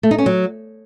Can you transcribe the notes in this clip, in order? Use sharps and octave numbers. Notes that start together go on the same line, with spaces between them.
A3
D#4
C#4
F#3